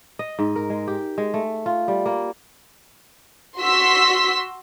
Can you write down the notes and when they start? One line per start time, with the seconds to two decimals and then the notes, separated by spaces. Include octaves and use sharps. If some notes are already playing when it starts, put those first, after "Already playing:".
0.19 D#5
0.39 G#2
0.56 A#4
0.70 G#3
0.88 G4
1.18 G#3
1.34 A3
1.66 F4
1.88 G3
2.06 A#3
3.60 F#4 C6 E6 B6